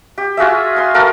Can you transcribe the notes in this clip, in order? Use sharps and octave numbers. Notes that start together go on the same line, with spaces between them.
G4
F4 F#4 G#4 E5
G#5 C6
F#4 A4 A#4 F5